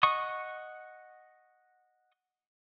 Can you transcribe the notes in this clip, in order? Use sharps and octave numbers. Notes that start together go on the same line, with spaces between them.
D#5 F#5 C#6 D#6